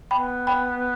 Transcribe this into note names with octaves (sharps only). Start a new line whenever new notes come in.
B3 G5 B5
G5 B5